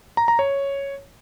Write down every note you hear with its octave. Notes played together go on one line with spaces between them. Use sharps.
A#5
A#5
C#5